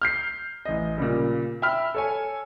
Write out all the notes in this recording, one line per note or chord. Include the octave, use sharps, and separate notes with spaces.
F6 G6 C7
A1 D#5
A#2 C#3 G3
E5 G5 B5 E6 F6
A4 C#5 G#5